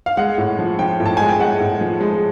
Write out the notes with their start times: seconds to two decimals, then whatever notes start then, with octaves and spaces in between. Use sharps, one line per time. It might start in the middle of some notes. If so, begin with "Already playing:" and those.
0.06 F5
0.17 G#3 F#5
0.38 A2
0.59 F3
0.79 F3 G5
1.00 A2
1.06 A5
1.17 G#3 G#5
1.29 G5
1.40 G#3 F#5
1.60 A2
1.81 F3
2.01 G#3